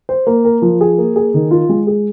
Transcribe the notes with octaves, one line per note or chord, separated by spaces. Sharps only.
C5
A#3
A#4
F3
G#4
A#3
G#4
D#3
F4
G#3
G#4